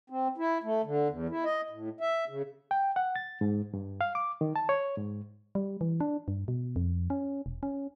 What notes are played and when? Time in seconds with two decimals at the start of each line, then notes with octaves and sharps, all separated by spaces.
0.10 C4
0.38 E4
0.63 A3
0.84 D3
1.09 E2
1.29 E4
1.44 D#5
1.70 A2
2.01 E5
2.29 C#3
2.71 G5
2.96 F#5
3.16 A6
3.41 G#2
3.74 G2
4.01 F5
4.15 D6
4.41 D#3
4.56 A5
4.69 C#5
4.97 G#2
5.55 G3
5.81 E3
6.00 D4
6.28 G2
6.48 B2
6.76 F2
7.10 C#4
7.46 E1
7.63 C#4